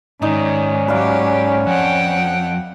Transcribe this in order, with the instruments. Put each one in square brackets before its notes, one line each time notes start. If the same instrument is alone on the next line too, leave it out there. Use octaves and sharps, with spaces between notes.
[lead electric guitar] G#2 [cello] D#3 [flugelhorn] C#4 [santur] D#4 D5
[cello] F#3 G4 [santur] B4 D5 F5
[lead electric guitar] F2 [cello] F#5 G5